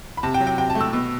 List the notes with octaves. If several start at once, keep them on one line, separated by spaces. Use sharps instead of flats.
B5
C3 A5
G5
F#3
G5
C3 G5
A5
A3
E6
B2